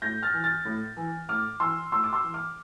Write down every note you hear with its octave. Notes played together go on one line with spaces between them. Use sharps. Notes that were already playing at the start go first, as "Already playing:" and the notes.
A2 G6 A#6
F6 A6
E3
F6 A6
A2
E3
A2 D6 F6
E3 C6 E6
A2 C6 E6
D6
C6 E6
E3
D6 F6